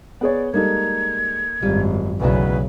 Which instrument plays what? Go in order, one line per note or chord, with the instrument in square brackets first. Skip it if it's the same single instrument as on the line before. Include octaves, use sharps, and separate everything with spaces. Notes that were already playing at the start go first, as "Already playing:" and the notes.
[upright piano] B3 G#4 C#5 [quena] D5
[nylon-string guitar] G3 G#3 [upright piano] A#3 D#4 A4 [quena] G#6
[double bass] G#1 F#2 [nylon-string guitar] G3 F4
[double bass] B1 C#3 [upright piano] E2 A2 [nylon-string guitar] F#4 D5 F#5 [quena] B4